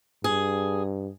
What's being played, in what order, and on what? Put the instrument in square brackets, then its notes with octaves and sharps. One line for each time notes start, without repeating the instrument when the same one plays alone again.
[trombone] G2 [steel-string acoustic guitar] G#4